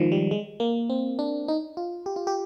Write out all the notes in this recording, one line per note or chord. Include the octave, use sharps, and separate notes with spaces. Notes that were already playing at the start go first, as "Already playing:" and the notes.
Already playing: D#3 F3 G#3
G3
G#3
A#3
C4
D4
D#4
F4
G4
F4
G4